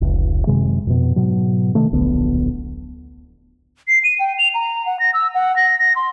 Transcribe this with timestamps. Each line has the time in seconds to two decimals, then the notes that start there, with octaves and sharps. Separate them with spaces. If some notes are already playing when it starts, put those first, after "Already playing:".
0.01 F1 C#2
0.47 F#2 C3 D#3 G#3
0.87 F2 B2
1.16 G#2 B2 F#3
1.75 C3 D#3 A3
1.92 D1 A#1 D3 B3
3.88 C7
4.04 D#7
4.20 G5
4.39 F7
4.55 A#5
4.86 F#5
5.00 A#6
5.14 E6
5.35 F#5
5.56 A#6
5.79 A#6
5.96 C6